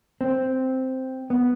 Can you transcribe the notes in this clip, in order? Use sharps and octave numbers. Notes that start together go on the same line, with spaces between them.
C4
B3